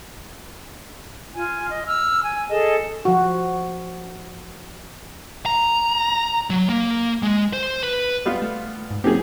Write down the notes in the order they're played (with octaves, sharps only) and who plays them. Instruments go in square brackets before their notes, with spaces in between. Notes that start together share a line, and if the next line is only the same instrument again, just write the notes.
[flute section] F4 G#5
D#5
E6 F6
G#5
G#4 A4 D#5 A5
[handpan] F3 F#4
[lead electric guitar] A#5
F#3
A#3
G#3
C5
B4
[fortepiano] G3 B3 F4
[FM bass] A3
G#2
[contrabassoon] F#1 [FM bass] C4 [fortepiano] G4 G#4